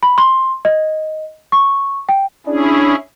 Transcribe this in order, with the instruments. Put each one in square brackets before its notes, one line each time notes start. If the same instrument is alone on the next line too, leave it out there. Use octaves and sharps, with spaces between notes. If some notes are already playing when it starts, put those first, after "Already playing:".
[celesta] B5
C6
D#5
C#6
G5
[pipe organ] C#4 E4 G#4 [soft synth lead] D4